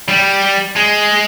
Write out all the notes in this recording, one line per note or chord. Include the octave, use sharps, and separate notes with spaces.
G3
G#3